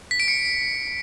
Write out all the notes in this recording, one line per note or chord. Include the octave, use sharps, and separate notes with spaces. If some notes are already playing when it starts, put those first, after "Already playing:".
B6
D7
C#7